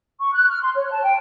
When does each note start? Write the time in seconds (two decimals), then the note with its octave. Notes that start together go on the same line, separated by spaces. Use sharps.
0.20 C#6
0.34 F#6
0.49 F6
0.62 C6
0.75 C#5
0.91 A5
1.03 G5